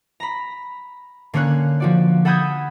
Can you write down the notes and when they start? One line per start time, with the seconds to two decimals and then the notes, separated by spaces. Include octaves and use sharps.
0.20 A#5 B5
1.34 D3 A#3 C#4 C#5 F#6
1.80 F3 F#4 D5
2.25 A4 F#5 B5 D#6 G6 G#6